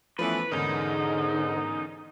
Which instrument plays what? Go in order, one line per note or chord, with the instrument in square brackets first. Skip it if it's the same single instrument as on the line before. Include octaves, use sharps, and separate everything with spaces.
[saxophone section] E3 A3 C#4 [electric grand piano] F3 B3 [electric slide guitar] B4
[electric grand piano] E2 C#4 A#4 [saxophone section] G#2 [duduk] D3 [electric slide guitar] D#4